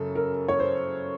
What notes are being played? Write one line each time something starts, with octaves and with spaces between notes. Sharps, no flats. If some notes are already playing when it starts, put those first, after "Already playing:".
Already playing: F#2 C#3 A4
A#4
C#5
C5